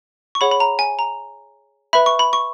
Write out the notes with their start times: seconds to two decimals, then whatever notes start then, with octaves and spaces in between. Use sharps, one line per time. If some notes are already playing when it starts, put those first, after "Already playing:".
0.35 C#6
0.41 G#4 C#5 F#5 B5
0.51 B5
0.60 A#5
0.79 G#5
0.99 A#5
1.93 B4 E5 B5
2.06 C#6
2.19 B5
2.33 C#6